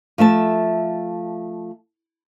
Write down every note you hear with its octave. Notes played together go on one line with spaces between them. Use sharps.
F3 A3 E5 A5